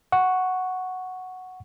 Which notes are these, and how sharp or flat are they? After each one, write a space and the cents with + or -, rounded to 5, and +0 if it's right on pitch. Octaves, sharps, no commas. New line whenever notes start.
F#5 +0 C#6 +0